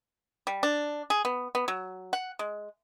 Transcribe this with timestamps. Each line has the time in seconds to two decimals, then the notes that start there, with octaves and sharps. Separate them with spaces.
0.47 G3
0.63 D4
1.10 G#4
1.25 B3
1.55 B3
1.68 F#3
2.13 F#5
2.39 G#3